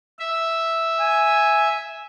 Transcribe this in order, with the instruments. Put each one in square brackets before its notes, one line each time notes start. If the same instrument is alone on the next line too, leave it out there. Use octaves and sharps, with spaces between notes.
[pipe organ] E5
[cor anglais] G#5